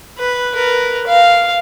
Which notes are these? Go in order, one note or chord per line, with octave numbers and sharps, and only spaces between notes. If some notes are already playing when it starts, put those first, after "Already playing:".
B4
A#4 B4
F5